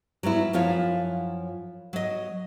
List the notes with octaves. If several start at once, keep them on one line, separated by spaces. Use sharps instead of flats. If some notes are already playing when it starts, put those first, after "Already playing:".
F#3 G3 B3 E4
F#2 F3 E4 F4 C#5 F5
F#3 D#5